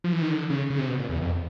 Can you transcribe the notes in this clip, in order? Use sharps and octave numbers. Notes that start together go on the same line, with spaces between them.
F3
E3
D#3
D3
C#3
C#3
C3
B2
A#2
E2
F2